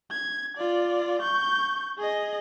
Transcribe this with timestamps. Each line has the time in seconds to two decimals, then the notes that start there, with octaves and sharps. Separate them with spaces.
0.10 G#6
0.57 F4 D5
1.22 C#6 G6
1.98 G#4 D#5